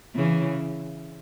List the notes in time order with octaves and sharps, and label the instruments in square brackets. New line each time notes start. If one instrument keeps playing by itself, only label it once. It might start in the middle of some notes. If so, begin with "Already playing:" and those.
[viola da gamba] C#3 E3